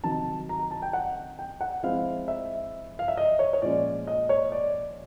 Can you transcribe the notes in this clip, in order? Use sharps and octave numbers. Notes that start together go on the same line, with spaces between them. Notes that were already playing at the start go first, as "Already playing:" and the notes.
C3 D#3 F#3 A5
A#5
A#5
A5
G5
F#5
G5
F#5
F3 G#3 C4 E4 F5
E5
F5
E5
D#5
C#5
C#5
A#2 F3 G#3 C#4 F4 D5
D#5
C#5
D5